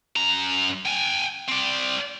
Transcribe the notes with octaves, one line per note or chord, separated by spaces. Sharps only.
F#2 A#5
G5 G#5
C4 D5